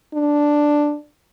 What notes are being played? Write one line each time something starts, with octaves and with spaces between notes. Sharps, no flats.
D4